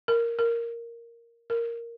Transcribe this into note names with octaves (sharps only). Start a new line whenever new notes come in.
A#4
A#4
A#4